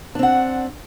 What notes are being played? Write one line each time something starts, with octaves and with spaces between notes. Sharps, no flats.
C4 D4 F#5